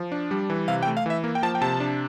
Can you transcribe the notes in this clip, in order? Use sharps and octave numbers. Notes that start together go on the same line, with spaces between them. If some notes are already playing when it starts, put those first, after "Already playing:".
Already playing: F3
D4
G3
E3
C3 F5
G5
A3
F5
E3 E5
A#3
G5
F3 A5
G5
C3 A5
D4